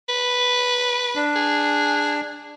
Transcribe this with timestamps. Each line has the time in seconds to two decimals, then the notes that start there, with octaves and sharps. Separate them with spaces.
0.09 B4
1.15 D4
1.36 G#4